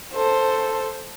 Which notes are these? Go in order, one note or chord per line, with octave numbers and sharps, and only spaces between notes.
A4 C5